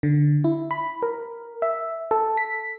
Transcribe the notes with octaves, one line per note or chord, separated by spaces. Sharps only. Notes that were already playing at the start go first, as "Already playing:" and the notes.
D3
E4
B5
A#4
E5
A4
B6